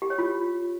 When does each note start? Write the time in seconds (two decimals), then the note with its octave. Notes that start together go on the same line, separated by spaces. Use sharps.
0.02 G4
0.10 C#5
0.19 F4